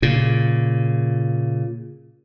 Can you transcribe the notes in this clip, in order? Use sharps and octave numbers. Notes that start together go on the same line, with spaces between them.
A#2 C#3